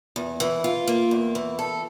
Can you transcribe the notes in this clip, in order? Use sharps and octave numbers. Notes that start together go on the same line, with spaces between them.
E2
E3
F4
A#3
E2
E3
A4